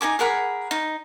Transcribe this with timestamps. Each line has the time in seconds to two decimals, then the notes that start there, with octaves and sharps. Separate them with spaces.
0.01 D#4 A4 G#5 D6
0.19 G#4 A#4 F#5 B5
0.71 D#4